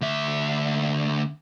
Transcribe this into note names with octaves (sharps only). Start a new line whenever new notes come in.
D2 E5